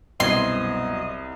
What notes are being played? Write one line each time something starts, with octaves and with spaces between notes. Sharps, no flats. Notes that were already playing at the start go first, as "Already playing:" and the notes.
C2 F#2 B2 C4 D#5 C6 G#6